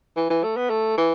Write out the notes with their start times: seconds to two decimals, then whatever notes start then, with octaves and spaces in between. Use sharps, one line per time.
0.16 E3
0.30 E3
0.44 A3
0.56 B3
0.70 A3
0.97 E3